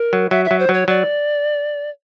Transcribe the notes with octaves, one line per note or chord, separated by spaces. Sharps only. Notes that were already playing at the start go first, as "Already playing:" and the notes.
Already playing: A#4
F#3
F#3 E5
E5
F#3
C5
F#3 C#5
F#3 D5